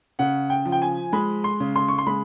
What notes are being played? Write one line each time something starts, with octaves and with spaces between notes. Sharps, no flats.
C#3 F#5
G5
F3
G5
G#5
G#3 B5
C6
C#3
C6
C#6
C6
G#3 B5